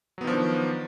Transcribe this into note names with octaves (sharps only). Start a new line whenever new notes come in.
D#3 F3 F#3 B3 D4